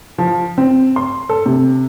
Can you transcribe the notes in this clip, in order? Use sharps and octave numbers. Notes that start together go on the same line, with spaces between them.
F3
C4
C6
A4
C3